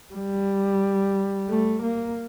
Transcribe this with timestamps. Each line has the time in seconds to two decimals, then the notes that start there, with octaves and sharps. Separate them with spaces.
0.13 G3
1.48 A3
1.82 A#3